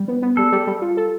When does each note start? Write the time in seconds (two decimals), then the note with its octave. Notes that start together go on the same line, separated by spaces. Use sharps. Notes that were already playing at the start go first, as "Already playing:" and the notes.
Already playing: G3
0.08 B3
0.22 B3
0.37 G3 A4
0.52 G3
0.67 G3
0.82 F4
0.97 A4